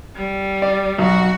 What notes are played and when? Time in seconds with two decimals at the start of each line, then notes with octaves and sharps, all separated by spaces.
0.16 G3
0.62 D5
0.98 B1 F#4